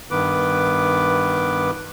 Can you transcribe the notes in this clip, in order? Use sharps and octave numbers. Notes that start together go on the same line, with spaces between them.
G2 D#3 B3 B4 D6